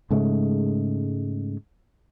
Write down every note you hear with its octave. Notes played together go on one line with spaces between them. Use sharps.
G#2 C#3 G#3 A3